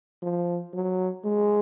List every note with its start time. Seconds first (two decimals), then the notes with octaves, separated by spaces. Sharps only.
0.22 F3
0.73 F#3
1.25 G#3